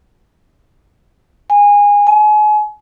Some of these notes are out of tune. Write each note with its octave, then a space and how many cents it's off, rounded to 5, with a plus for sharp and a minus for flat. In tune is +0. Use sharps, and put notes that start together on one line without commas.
G#5 -20
G#5 +35